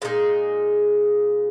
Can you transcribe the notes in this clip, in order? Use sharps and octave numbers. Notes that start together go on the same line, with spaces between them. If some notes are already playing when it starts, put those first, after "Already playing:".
A#2 G#3 D#4 G#4